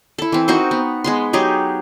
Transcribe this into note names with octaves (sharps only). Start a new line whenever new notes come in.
E4 A4
E3 C4
D#4 F#4 A#4 C5
B3
G#3 B3 C6
F#3 D#4 G4 G#4